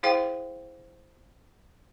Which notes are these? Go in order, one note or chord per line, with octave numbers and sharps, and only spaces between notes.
E4 G#4 C5 F5 G5